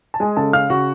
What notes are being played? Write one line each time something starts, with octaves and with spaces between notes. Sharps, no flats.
A5
G#3 G#4 G#5
C#3 A4 A5
C#3 F5 F6
C#3 F#4 F#5